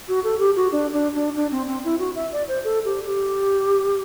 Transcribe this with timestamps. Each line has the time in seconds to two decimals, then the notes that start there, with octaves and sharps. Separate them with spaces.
0.08 F#4
0.24 A4
0.39 G4
0.56 F#4
0.72 D4
0.93 D4
1.15 D4
1.36 D4
1.51 C4
1.68 C4
1.84 E4
1.99 F#4
2.15 E5
2.32 D5
2.48 C5
2.64 A4
2.85 G4
3.06 G4